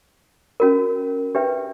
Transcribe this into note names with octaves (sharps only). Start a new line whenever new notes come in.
C#4 F#4 A#4
D4 G4 B4 E5 G5